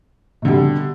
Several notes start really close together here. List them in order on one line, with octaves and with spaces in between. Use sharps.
B2 D3 G3